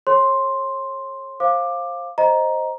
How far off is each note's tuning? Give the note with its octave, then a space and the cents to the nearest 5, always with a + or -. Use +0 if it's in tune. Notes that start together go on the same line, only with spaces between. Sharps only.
A4 -30 C#5 -35 C6 +5
C5 +25 F5 +0 D6 +15
C5 +5 D#5 +0 A#5 +10